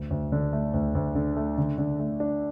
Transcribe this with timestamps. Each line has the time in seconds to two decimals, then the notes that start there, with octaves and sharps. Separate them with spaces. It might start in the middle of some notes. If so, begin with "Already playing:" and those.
Already playing: D2
0.10 D2
0.32 D3
0.53 A3
0.74 D2
0.95 D2
1.15 D3
1.37 A3
1.58 D3
1.78 D3
2.00 A3
2.20 D4